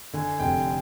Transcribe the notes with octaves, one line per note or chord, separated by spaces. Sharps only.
D3 G#5
F1 G5